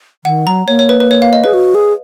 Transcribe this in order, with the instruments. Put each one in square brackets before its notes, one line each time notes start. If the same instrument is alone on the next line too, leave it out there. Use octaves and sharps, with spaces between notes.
[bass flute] D#3 [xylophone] F#5
[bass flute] F#3 [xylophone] A#5
[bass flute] A#3 [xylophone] C#5
[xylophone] C#5
B4
B4
C#5
F5
D#5
[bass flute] G#4 [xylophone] B4
[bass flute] F#4
G#4